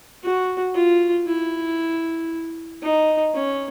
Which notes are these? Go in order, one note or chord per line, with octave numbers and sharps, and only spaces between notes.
F#4
F4
E4
D#4
C#4